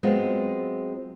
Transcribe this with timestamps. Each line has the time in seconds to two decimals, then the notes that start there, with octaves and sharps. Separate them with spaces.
0.03 F#3 G#3 B3 C4 F4